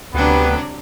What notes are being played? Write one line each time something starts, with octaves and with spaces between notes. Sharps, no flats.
D2 C3 F#3 B3 D4 G4 B4